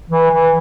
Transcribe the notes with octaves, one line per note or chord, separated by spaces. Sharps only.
E3
E3